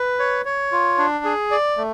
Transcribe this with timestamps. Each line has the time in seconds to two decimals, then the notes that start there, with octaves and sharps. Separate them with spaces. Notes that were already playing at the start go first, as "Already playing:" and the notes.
Already playing: B4
0.19 C#5
0.45 C#5
0.72 F4
0.98 D4
1.25 G#4
1.51 D5
1.77 A3